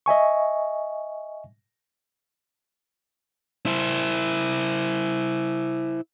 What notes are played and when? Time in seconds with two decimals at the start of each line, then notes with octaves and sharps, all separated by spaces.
0.06 D#5 E5 G#5 C#6
3.66 E4 C5